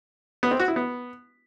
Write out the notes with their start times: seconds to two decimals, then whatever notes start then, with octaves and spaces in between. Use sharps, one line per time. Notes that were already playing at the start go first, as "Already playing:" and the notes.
0.43 B3
0.51 C4
0.60 F#4
0.68 E4
0.76 B3